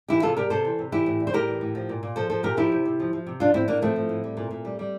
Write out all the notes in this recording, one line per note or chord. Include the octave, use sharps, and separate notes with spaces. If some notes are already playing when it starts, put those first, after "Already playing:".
E3 E4 G4
C3 F4 A4
G3 G4 A#4
C3 A4 C5
E3
C3
E3 E4 G4
A2
G3
C5
A2 G4 A#4
E3
A2
F3
A#2
A#2
F3 A4 C5
F3 A4 C5
A#2 G4 A#4
F3 E4 G4
C3
C3
F3
F3
C3
F3 D4 F4
A2 C4 E4
A2 A#3 D4
F3 A3 C4
F3
A2
G3
A#2
A#2
G3
G3